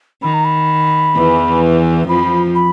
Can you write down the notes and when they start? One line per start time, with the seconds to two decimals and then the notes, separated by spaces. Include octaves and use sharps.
0.22 D#3 B5
0.34 A#5
0.45 B5
1.15 E2 E3
2.09 F2 F3 B5
2.55 B5